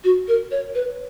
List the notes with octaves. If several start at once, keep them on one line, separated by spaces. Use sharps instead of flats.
F#4
A#4
C#5
B4